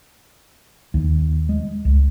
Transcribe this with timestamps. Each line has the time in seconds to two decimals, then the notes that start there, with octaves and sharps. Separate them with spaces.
0.94 D#2
1.49 G#3
1.85 C#2